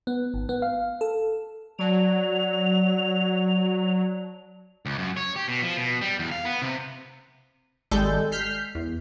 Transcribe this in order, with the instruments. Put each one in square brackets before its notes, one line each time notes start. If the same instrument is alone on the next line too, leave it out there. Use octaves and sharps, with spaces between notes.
[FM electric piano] B3
G#1
B3
F5
A4
[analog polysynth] F#3 [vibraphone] D5 A5 [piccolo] F7
[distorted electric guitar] C#2
F#2
C#5
G4
B2
F3
B2
G3
E2
F5
B3
C3
[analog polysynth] G#1 G3 G#3 A4 G6
F6 G6 B6 C7
E2